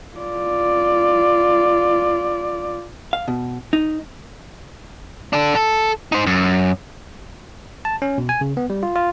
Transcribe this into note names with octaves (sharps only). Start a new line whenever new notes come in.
F4 D5
F5
B2
D#4
D4 A4
A4
D#4 C5
F#2
A5
C#4
B2
G#5
C#3
B3
G3
F4
F4